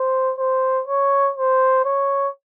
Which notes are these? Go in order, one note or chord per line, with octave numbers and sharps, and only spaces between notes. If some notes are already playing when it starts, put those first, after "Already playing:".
Already playing: C5
C5
C#5
C5
C#5